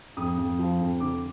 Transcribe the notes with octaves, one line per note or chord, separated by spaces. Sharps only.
F2 D#6
F2
F3
F2
D3 D6